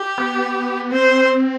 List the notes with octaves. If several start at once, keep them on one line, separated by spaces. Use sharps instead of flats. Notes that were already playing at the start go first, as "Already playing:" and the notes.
Already playing: G4
B3
C4 C5